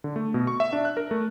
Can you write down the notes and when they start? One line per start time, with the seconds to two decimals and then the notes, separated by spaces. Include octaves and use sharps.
0.04 D3
0.16 A3
0.34 B2
0.47 C#6
0.60 E5
0.73 D4
0.85 F#6
0.97 A#4
1.11 A3